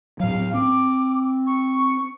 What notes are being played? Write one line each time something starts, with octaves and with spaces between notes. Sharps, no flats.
A2 F#3 F5
C4 D6
C#6